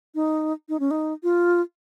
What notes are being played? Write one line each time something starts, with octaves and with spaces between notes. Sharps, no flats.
D#4
D#4
C#4
D#4
F4